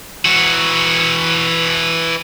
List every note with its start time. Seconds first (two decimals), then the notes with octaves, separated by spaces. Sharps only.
0.25 E3 F#4